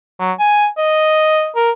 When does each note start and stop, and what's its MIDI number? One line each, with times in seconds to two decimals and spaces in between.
0.20 0.32 54
0.39 0.67 80
0.77 1.49 75
1.56 1.71 70